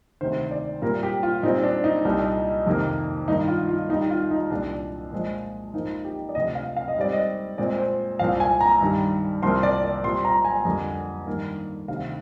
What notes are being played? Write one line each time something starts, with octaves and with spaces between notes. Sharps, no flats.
D2 C3 D#3 C5
D5
A#2 G3 A#3 A#4
G4
F4
A#2 G3 C4 D#4
D4
D#4
C2 A#2 G3
F2 C3 D#3 A#3
G2 D#3 A#3 D#4
F4
F4
D#2 D#3 G3 D#4
F4
D#4
C2 A#2 G3 D4
A#2 F3 G#3
G#2 F3 A#3 D#4
G4
D5
D2 C3 F3 D#5
F5
F5
D#5
G#2 G3 C4 D5
D#5
A#2 G#3 C4 D5
C5
C2 A#2 F3 F5
G#5
A#5
G2 D#3 G3
C2 C3 F3 A#3 C6
D5
D5
A#2 G3 C4 C6
A#5
G#5
F2 D3 G3 A#3
G2 D#3 A#3
D2 C3 D#3 F5